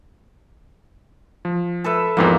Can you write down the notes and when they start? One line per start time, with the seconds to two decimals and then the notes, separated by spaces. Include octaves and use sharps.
1.45 F3
1.84 A4 B4 E5
2.17 E2 G#2 F3 A#3 C4 F4